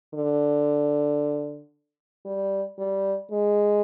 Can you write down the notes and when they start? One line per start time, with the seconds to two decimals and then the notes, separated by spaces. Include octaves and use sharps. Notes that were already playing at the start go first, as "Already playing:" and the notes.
0.14 D3
2.25 G3
2.79 G3
3.31 G#3